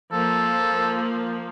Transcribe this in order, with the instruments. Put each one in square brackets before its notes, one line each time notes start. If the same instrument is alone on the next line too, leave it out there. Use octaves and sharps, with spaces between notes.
[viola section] F3 A#3 [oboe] A4